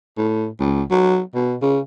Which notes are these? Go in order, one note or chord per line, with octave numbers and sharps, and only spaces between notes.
A2
C#2
F#3
B2
C#3